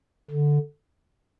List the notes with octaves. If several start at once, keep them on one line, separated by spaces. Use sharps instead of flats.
D3